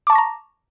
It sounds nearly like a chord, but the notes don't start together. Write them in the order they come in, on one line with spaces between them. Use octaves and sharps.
D6 A5 C#6 A#6 A#5